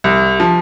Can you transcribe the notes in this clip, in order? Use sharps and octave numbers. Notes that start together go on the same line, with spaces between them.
C2
F3